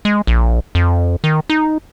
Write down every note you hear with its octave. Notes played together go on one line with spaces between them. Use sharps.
G#3
A#1
F2
D#3
D#4